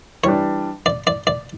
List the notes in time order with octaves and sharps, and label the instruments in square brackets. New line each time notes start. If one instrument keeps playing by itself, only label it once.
[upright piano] E3 G3 D4 [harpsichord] C#5
[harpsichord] D5
D5
D5